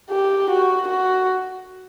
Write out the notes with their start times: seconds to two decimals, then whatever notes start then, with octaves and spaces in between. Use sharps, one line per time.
0.10 G4
0.50 F#4
0.88 F#4